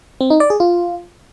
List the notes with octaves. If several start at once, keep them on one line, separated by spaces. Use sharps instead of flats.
C4
D#4
D5
G#4
F4